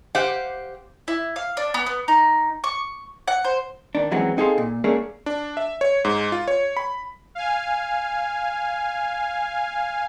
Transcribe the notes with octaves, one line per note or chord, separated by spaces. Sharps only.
G4 C5 F5 F#5
E4
F5
D4
B3
B3
D#4
C#6
F#5
C5
D#3 D4
F#2 E3 F#3 G#3 C4 C#4
C4 D#4 G#4 A4 F5 C6
A#2
A3 A#3 C#4 D4 G#4 A#4
D4
E5
C#5
G#2
F4
C#5
B5
F5 G#5